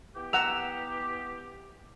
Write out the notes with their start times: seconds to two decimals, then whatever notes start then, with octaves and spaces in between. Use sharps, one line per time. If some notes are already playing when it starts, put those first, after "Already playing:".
0.16 E3 B3 G4
0.33 F#5 A#5 E6 F7